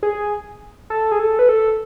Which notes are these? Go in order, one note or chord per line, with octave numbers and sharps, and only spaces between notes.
G#4
A4
G#4
A4
B4
A4